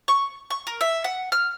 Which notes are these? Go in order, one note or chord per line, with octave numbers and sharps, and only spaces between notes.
C#6
C#6
A#4
E5
F#5
F6